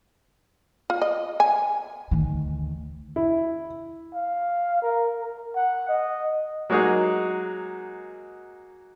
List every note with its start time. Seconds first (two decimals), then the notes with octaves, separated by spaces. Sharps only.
0.90 F4
1.02 D#5
1.40 G#5
2.11 D2 D#3
3.16 E4
4.15 F5
4.83 A#4
5.21 A#4
5.56 F#5
5.89 D#5
6.70 F#3 G#3 A#3 D#4 F#4 G#4